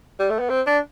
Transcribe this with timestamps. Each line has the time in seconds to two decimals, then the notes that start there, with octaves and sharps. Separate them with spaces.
0.19 G3
0.30 A3
0.39 B3
0.49 C4
0.66 D4